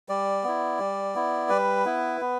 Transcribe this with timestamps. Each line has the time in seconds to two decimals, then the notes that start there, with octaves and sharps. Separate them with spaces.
0.09 G3 D5
0.44 B3 E4
0.79 G3
1.15 B3 E4
1.49 G3 B4
1.85 B3 E4
2.21 B3